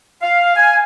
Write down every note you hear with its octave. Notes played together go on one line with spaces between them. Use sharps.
F5
G#5